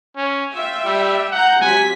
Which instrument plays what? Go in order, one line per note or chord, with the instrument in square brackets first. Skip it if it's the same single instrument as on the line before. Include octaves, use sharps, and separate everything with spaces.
[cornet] C#4
[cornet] F4 [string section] E5 G5
[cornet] G3
[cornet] F#5 [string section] A#5 G6
[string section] C3 F#3 B6 [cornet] G#5